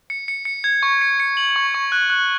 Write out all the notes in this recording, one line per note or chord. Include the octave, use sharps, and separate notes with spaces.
C#7
C#7
C#7
G#6
C#6
C#7
C#7
F#7
C#6
C#6
F#6
F#6